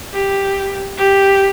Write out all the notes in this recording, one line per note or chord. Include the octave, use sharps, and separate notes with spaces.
G4
G4